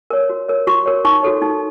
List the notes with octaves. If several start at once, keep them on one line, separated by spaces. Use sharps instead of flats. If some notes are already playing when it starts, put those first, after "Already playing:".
A#4 C#5
F#4
A#4 C#5
F#4 C#6
A#4 C#5
D#4 C#6
F#4 A4 C#5
D#4